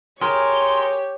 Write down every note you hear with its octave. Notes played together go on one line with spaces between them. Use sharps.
G4 G#4 A#4 C#5 C6